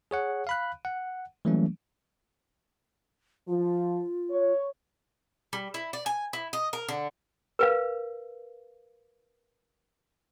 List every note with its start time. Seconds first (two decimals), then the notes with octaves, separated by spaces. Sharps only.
0.11 G#4 C#5 F#5
0.47 F5 B5 F#6
0.85 F#5
1.45 E3 F#3 G3 A3 A#3 C#4
3.48 F3 F4
4.30 C#5
5.53 G3
5.74 E4
5.93 D5
6.06 G#5
6.33 E4
6.53 D#5
6.73 A#4
6.89 D3
7.59 A#4 B4 F5